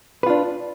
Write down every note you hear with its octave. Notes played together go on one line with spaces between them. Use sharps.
D4 F4 B4